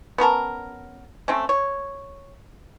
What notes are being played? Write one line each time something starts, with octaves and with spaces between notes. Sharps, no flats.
B3 C#4 A#4 A5
A3 C4 C#4
C#5